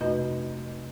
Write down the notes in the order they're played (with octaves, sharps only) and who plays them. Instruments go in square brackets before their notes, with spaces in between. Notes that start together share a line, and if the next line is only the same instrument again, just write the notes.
[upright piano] F1 [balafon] F#4 B4 D#5